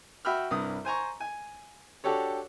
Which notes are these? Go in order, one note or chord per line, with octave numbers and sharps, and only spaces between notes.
F#4 E5 G5 B5 F6
C2 G2 D#6
C5 G#5 A#5 C#6
G#5
D4 F#4 G4 A4 C#5